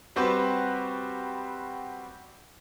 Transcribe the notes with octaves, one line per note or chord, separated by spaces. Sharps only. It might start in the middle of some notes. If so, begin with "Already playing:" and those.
G3 C4 F#4 G4 B4 C5